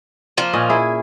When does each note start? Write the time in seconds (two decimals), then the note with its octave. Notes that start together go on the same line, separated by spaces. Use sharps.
0.37 F3 A#3
0.53 A#2 C#4 D#5
0.69 E4 G#4